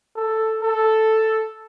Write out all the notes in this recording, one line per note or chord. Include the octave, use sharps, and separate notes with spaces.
A4
A4